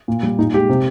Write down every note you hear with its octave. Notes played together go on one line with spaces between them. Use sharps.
A#2
G3
A#2 D#4
G#3 G4
C3